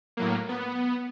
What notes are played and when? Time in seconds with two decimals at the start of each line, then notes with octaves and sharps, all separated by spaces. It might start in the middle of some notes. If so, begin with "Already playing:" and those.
0.17 A2 F#3 A#3
0.49 B3